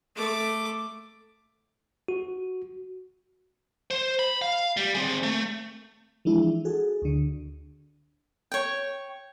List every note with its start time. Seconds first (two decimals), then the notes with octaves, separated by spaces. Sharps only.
0.16 A3 D6
2.08 F#4
3.91 C5
4.19 B5
4.42 F5
4.77 G3
4.95 C4 G#4
5.23 A3
6.25 E3 F3 G#3 D4 E4
6.65 F#4 G#4 A4
7.02 D2 D3
8.52 C#5 G5